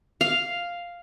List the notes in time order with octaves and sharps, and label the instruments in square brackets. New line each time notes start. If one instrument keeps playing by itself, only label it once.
[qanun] F5